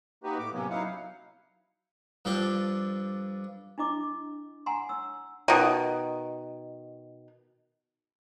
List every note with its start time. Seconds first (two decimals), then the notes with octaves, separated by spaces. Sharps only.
0.24 A#3 D#4 F#4 G4 B4
0.39 A2 D6
0.53 C3 F#3 A#3 B3 C#4
0.70 F#3 D#4 E4 F5 F#5
2.25 G2 F3 D4 A4 G5
3.78 D4 E4 D#5 D6
4.66 F#5 G#5 A#5 C6
4.89 E6
5.48 B2 D#3